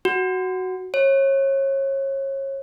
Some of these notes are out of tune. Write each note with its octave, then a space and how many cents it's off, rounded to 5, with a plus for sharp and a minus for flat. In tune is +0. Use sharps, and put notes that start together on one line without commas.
F#4 +5
C#5 -30